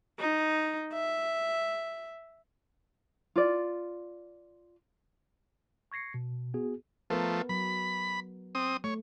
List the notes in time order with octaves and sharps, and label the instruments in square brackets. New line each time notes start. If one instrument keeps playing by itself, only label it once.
[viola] D#4
E5
[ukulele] F4 D5
[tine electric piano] C#6 G#6 A#6 C7 C#7
B2
B3 F#4 G#4
[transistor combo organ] F3 A3 [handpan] B3 A#4 B4
[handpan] F#3 [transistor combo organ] B5
[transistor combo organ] C4 D#6
[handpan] A3 [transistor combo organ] C#5